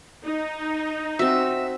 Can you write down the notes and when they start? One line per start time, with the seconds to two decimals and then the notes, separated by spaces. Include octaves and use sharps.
0.24 D#4
1.19 C4 F#4 E5